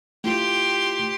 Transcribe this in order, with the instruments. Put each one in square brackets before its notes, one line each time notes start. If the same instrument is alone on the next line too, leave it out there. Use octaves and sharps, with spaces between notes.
[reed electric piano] A3 E4 F4 [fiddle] G4 C6